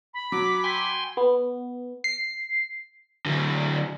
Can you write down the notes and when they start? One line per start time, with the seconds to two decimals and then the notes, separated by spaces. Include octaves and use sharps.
0.14 B5
0.32 F#3 D6
0.64 G5 G#5 C6
1.17 B3
2.04 C7
3.26 D3 F#3